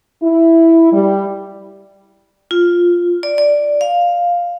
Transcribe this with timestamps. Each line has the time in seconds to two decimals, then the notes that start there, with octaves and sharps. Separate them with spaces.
0.23 E4
0.92 G3
2.51 F4
3.23 D5
3.38 D5
3.81 F5